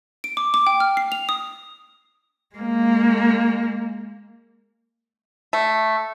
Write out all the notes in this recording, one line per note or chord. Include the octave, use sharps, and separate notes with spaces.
D7
D6
D6
G5
F6
C7
F7
D#6
G#3 A#3
A3